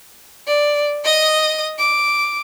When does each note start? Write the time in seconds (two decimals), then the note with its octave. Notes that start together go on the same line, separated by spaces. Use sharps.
0.48 D5
1.05 D#5 D#6
1.79 D6